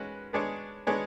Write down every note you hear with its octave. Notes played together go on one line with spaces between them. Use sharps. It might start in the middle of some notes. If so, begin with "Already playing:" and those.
Already playing: G#3 C#4 F#4 B4
G#3 B3 D4 G#4 C#5
G#3 B3 D4 G#4 C#5